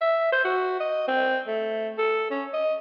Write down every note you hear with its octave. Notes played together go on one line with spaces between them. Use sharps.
E5
C5
F#4
D#5
C4
A3
A4
C#4
D#5